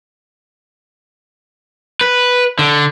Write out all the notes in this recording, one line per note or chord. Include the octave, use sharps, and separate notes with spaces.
B4
D3